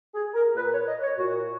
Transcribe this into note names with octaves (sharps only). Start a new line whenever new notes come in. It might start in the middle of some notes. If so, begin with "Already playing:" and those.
G#4
A#4
A#2 B4
C#5
D#5
C#5
A#2 F#4